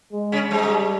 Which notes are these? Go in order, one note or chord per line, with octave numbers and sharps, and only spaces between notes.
G#3
C#3 C#4
G#2 G3 G#3